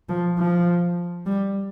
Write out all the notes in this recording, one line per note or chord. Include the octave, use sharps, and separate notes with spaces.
F3
F3
G3